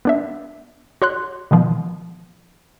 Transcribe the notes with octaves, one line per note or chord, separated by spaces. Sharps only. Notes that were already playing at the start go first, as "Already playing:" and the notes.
B3 D4 E5
F#4 C#5 C6 F#6
B2 D#3 F3 B3